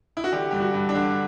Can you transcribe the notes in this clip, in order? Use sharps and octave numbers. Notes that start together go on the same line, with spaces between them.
E4
F#4
D3 G4
G2 G4
F#4
G2
D4
D3